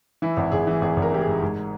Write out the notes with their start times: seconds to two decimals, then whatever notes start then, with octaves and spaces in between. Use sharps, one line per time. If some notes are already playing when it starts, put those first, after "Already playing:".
0.22 E3 E4
0.37 G#1
0.52 G#1 G#4
0.67 E3
0.81 G#1 G#4
0.97 G#1
1.02 A#4
1.12 E3 G4
1.21 G#4
1.27 G#2
1.42 G#2